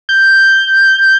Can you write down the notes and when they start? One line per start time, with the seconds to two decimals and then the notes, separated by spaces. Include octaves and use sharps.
0.09 G6